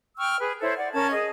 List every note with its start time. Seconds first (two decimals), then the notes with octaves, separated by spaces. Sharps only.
0.18 G5 C#6 E6 F6
0.39 G#4 B4
0.61 E4 A4 C5 C#5
0.76 D5 F#5
0.93 C#4 A#4 A5 G#6
1.11 G#4 D#5